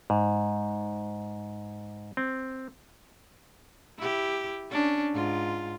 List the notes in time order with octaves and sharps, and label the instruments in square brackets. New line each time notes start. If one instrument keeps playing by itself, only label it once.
[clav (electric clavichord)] G#2
C4
[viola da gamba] E4 G4
C#4 D4
G#2 F4